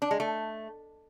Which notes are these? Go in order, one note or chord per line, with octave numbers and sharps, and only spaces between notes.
D4
G#3
A3